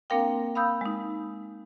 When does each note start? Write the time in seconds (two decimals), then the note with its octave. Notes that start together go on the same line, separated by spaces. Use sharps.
0.10 A#3 C4 D4 A#4 F5 G5
0.55 F5 B5 D#6 E6 G6
0.81 G#3 D#4